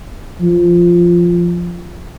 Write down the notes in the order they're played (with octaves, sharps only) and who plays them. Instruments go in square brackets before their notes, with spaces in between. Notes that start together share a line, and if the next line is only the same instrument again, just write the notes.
[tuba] F3